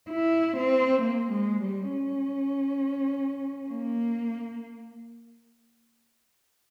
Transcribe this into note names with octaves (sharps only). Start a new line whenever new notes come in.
E4
C4
A#3
G#3
G3
C#4
A#3